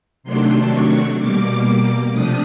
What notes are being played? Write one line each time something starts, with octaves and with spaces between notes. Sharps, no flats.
C3 D#3 F#3 A3 D4 C6
C#6
B2 G3 A#3 D6
C3 F3 A3 D4 D#6